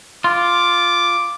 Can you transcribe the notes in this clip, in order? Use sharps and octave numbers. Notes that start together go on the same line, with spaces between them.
F4 D6